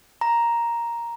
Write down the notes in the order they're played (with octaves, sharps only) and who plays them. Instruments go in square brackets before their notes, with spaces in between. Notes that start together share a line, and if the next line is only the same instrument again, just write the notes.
[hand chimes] A#5